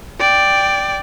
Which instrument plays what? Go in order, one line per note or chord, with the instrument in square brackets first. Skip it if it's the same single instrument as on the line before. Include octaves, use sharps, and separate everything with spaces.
[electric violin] D5 G5